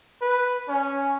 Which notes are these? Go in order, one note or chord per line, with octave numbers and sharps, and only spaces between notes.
B4
C#4